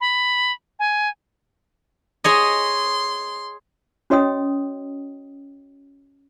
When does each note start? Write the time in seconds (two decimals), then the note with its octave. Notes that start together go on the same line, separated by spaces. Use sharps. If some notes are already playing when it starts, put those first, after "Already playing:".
0.01 B5
0.79 G#5
2.24 G#4 C#5 D#5 C6
4.10 C#4 F#4 C#5 D#5 G5 D#6